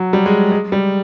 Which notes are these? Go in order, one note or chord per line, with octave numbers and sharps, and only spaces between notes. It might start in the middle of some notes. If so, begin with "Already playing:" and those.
Already playing: F#3
G3
G#3
G#3
G3